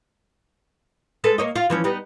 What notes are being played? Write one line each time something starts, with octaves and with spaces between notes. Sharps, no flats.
G#3 A4 B4
A#3 C#5 D#5
F4
E3 F3 C#4
G3 B3 D#4